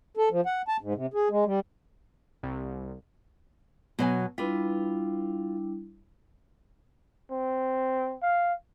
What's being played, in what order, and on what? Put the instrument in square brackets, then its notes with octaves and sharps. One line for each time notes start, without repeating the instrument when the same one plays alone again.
[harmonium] A4
F3
F#5
A5
G#2
C3
G#4
G#3
G3
[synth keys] C2
[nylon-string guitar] B2 F#3 G#5
[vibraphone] G3 D4 E4 [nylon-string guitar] F4 B4
[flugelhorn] C4
F5